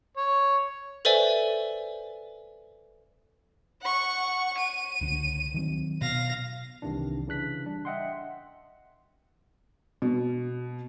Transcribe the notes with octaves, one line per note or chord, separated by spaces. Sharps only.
C#5
A4 B4 C5 D5 E5 G#5
F#5 C#6
D#7
C#2 D3
D#3 F#3 C4
B2 F5 A#6
C2 C3 D#3 E3 D4
C#3 E3 D4 F#6 B6
G3 D4
D#5 E5 F#5 G5 C6
B2